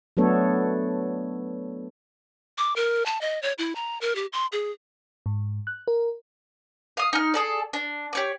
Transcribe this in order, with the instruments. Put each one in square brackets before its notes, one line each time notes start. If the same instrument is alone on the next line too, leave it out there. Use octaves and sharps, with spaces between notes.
[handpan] F#3 A3 B3 D4 A4 C#5
[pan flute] D6
A#4
A5
D#5
C#5
E4
A#5
A#4
G4
C6
G#4
[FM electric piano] G#2
F#6
A#4
[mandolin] F5 D#6
D#4 F6
G#4 A4 D5
D4
G4 C#5 D5